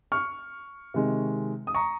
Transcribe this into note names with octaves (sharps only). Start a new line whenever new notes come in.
C#6 F6
C3 D#3 G#3
D#6
A#5 C#6